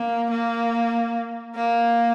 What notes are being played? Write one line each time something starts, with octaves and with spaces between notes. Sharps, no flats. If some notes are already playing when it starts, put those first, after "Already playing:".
Already playing: A#3
A#3
A#3